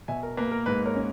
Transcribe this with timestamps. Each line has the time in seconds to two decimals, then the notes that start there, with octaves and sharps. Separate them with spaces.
0.08 B2 E5 G#5
0.23 A#4
0.37 A#3 B4
0.52 A#4
0.66 G#2 B4
0.85 A#4 C#5
0.95 C#4